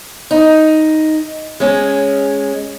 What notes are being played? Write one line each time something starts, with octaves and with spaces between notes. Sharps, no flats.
D#4
G#3 C#4